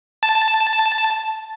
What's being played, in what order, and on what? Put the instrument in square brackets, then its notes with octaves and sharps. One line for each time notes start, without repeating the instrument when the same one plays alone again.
[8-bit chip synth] A5